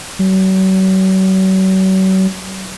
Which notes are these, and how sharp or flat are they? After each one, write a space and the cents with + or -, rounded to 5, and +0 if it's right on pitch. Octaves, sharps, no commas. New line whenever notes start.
F#3 +40